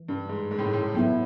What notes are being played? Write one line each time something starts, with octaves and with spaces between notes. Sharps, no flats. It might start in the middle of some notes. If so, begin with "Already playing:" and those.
Already playing: E3
G2
G#2
G#2
A2
G#2
A2
G#2
A2 F#3 B3 E4